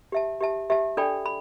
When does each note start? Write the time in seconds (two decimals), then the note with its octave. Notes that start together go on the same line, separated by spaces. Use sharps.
0.12 G4 E5 A5
0.40 G4 E5 A5
0.70 G4 E5 A5
0.97 D4 A4 D5 G5 B5
1.26 B5